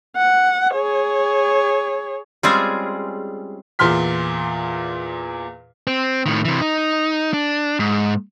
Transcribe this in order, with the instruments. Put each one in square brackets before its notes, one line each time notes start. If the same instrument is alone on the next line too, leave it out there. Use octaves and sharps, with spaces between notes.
[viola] F#5
G#4 C#5
[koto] G3 G#3 C4 C#4 F4 G#4
[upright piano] E2 A#2 C6 F6 B6
[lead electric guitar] C4
A2 D#3
C3 E3
D#4
D4
G#2